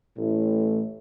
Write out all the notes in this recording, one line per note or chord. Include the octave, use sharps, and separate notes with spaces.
A1 A2